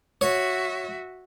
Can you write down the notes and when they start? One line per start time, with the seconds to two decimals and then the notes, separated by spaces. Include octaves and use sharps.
0.21 F#4 C#5 E5